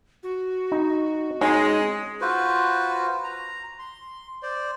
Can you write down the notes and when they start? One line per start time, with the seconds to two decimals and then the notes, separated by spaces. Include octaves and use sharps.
0.23 F#4
0.72 D#4
1.41 G#3 C#4 D#4
2.21 F4 F#4 B4 C5
3.24 A#5
3.79 C6
4.43 C5 D5